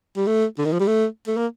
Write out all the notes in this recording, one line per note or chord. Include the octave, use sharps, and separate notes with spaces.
G3
A3
D3
D#3
F3
G3
A3
A3
A#3